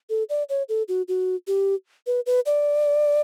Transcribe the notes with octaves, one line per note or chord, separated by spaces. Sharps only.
A4
D5
C#5
A4
F#4
F#4
G4
B4
B4
D5